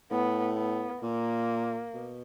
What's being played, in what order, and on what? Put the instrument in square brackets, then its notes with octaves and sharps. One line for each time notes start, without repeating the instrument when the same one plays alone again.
[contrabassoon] A2 [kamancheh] B3
[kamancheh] B3
[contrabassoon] A#2 [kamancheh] A#3
[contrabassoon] B2